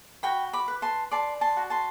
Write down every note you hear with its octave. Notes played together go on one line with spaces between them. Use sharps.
F#4 G5 B5
B5 D6
B4
A5 C6
D5 A5 C6
A5 C6
F#4
A5 C6